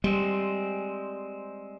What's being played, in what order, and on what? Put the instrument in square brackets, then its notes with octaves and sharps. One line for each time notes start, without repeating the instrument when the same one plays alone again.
[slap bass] G3 [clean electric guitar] G#3 C4